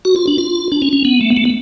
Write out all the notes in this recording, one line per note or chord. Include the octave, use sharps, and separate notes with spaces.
F#4
F4
D4
F4
D4
C#4
C#4
B3
A3
B3
A3
B3